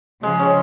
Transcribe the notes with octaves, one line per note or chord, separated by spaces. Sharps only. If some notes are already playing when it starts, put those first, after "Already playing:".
C#3 F3 G#3
C#4 G#4